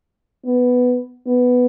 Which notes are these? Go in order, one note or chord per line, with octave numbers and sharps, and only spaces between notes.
B3
B3